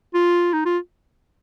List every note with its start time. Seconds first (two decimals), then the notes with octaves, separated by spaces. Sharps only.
0.14 F4
0.53 D#4
0.66 F4